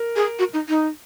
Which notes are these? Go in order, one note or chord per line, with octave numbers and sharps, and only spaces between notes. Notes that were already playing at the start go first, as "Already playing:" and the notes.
Already playing: A#4
G#4
F#4
D#4
D#4